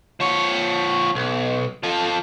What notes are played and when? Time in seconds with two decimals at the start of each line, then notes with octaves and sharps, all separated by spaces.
0.20 F3 C#5
1.15 B1
1.83 F3 A4